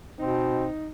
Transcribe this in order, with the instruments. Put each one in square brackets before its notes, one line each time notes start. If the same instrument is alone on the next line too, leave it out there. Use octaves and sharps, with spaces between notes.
[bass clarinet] B2 [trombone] C4 [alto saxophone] D#4